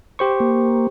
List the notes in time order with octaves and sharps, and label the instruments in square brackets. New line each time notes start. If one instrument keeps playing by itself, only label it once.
[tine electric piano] G4 C5 C#6
[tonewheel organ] A#3